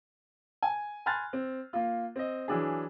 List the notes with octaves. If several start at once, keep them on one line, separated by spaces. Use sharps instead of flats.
G#5
G#5 B5 C6 F6 F#6 A6
C4
A#3 F4
C4 D#5
E3 F#3 D4 G#4